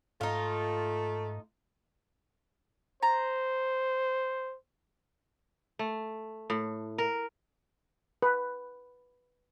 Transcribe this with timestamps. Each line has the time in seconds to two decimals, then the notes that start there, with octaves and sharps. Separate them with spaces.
0.21 G#2 A3 D#4 F4
3.03 C5 A#5
5.79 A3
6.50 A2
6.98 A#4
8.22 B4